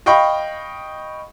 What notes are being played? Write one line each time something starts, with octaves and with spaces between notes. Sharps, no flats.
D#5 F5 G5 B5 C#6